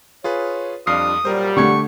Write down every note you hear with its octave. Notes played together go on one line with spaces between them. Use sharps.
F4 G#4 B4 C#5
F2 G3 D4 F4 D#6 F6 C7
A#2 F#3 G3 A#4 C5
D3 A3 G4 F#5 C#6 G#6